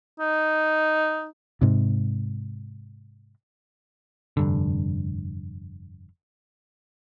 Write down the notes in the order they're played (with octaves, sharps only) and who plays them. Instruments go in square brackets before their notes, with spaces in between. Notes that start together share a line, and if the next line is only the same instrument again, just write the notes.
[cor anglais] D#4
[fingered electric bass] G#2 C3
[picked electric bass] F1 G2 D3